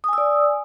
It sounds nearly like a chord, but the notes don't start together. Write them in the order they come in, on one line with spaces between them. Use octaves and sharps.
D#6 G#5 E6 D5